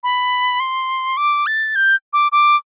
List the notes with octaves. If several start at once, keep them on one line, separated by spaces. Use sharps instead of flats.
B5
C6
D6
A6
G6
D6
D6